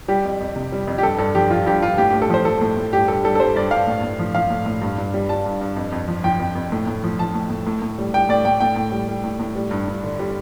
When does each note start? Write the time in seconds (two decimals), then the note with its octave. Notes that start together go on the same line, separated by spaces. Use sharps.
0.08 G3 G4
0.25 F2
0.41 F2
0.56 C3
0.72 G3
0.87 F2
0.98 G4
1.03 G2 A4
1.18 G2 A4
1.35 F3 G4
1.51 F3 F4
1.66 G2 G4
1.82 G2 F4
1.98 A2 G4
2.10 A2 G4
2.22 A4
2.30 F3 C5
2.45 F3 A4
2.61 A2
2.77 A2
2.93 G2 G4
3.08 G2 A4
3.24 G3 A4
3.35 A4
3.40 G3 C5
3.56 G2 D5
3.71 G2 F5
3.87 A2
4.03 A2
4.19 F3
4.35 F3 F5
4.50 A2
4.66 A2
4.82 G2
4.98 G2
5.14 G3
5.29 G3 A5
5.46 G2
5.61 G2
5.76 F2
5.92 F2
6.08 F3
6.24 F3 G5
6.39 F2
6.55 F2
6.72 A2
6.87 A2
7.04 F3
7.19 F3 A5
7.34 A2
7.50 A2
7.67 A2
7.82 A2
7.98 G3
8.14 G3 G5
8.29 A2 D5
8.45 A2 G5
8.60 A2 G5
8.76 A2
8.92 G3
9.08 G3
9.24 A2
9.40 A2
9.55 G3
9.71 G2
9.88 G2
10.04 D3
10.19 G3